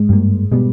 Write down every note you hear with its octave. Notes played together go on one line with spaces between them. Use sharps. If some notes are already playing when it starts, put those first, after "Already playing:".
Already playing: G#2 G#3
G2 G3 A#3
B2 G3 G#3 B3